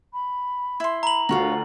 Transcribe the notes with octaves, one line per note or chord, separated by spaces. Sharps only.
B5
E4 C6
A#5 B5 F#7
D2 F4 F#4 A#4 C#5 F5